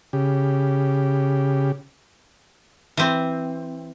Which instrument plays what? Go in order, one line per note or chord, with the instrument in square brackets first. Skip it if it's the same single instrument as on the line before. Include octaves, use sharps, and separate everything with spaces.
[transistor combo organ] C#3 G4
[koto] E3 C4